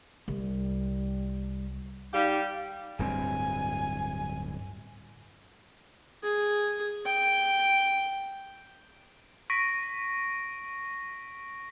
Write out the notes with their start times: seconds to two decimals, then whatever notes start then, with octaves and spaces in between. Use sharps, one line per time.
0.28 C2 G3
2.13 G3 D#4 G4 F5
2.99 D1 G2 C4 G#5
6.23 G#4
7.06 G5
9.50 C#6 A#6 B6 D7